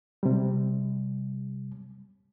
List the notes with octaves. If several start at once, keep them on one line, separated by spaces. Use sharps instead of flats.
C3 G3